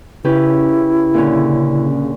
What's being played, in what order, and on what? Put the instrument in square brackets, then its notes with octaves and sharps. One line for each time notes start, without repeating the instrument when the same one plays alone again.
[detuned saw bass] C#3 [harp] C#4 G4 B4 [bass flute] E4
[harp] A#2 D3 C#4